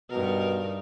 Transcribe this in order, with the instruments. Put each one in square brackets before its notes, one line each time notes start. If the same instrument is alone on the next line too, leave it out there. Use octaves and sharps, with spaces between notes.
[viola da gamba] G2 D#4 A#4 [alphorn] B2